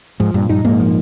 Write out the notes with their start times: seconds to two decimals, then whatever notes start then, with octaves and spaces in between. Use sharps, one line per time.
0.20 G#2 F3
0.34 G2 A#2
0.49 G2 D#4
0.65 G#2 A#3
0.80 F3